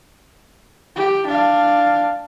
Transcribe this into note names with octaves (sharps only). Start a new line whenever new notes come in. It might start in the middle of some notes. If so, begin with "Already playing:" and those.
G4
D4 F5